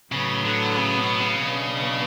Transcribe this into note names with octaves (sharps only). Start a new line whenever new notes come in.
A2 C#3 F#3 B3
D3
C#3
B2
C#3
B2 F#3 B3 D4